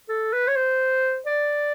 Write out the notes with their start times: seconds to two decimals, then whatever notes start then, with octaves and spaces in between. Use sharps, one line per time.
0.09 A4
0.33 B4
0.48 C#5
0.56 C5
1.26 D5